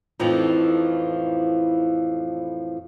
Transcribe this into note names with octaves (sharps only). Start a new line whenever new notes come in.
F2 A2 E3 F3 D#4